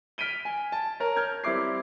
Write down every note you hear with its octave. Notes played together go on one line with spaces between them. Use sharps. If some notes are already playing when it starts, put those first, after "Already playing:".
F6 B6 D7 D#7 G7
G#5
A5
A#4 C#5
F6 G6 G#6
G3 C4 E4 D6 C7